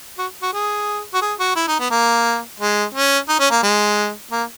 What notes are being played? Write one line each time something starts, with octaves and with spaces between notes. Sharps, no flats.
F#4
F#4
G#4
F#4
G#4
F#4
E4
D#4
B3
A#3
G#3
C#4
D#4
C#4
A#3
G#3
A#3